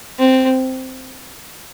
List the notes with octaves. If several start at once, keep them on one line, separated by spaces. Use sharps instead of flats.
C4